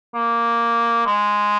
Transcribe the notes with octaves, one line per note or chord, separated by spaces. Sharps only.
A#3
G#3